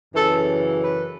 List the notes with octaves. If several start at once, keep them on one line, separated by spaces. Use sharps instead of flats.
F#2 C#3 E3 A4
B4